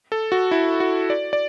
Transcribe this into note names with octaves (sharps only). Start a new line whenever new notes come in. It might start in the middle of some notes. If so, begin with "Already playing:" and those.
A4
F#4
E4
F#4
D5
D5